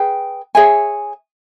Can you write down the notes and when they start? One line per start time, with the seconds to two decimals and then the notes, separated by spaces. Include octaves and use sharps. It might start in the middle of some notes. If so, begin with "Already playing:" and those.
Already playing: G#4 B4 G5
0.55 G#4 C#5 E5 G#5